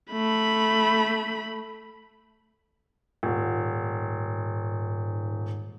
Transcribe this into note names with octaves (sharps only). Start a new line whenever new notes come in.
A3 B5
D#1 G#2